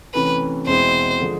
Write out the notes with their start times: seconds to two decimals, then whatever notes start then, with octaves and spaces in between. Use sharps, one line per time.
0.14 C3 E3 A3 C#4 B4
0.67 E2 B2 G#3 C4 E4 C5
1.20 D3 F3 G#3